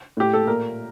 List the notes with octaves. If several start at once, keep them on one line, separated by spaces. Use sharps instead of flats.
A2 G4
A4
A#2 A#4